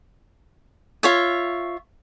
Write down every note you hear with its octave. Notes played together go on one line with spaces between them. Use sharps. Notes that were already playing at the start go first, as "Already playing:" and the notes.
F4 C#5 E5